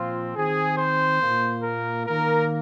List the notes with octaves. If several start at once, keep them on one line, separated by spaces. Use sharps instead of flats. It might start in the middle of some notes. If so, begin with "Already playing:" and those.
Already playing: A#2 F3 C4 F4
D#3 C4 G#4
C5
A#2 A#3
A#4
D#3 A#3 A#4